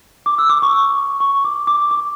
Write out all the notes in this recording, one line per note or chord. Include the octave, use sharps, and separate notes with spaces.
D6
E6
D6
C#6
C#6
D6
D6
D6